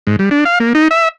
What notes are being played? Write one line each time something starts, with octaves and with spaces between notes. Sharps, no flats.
G#2
G3
D4
F5
A#3
D#4
E5